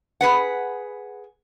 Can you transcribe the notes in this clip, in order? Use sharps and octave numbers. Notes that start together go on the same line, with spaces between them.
G#4 B4 F#5